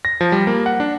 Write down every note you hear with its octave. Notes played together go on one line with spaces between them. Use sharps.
A#6
F3
G3
A#3
F#5
D4